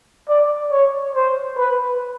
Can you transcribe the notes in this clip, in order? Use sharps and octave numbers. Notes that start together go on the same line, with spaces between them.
D5
C#5
C5
B4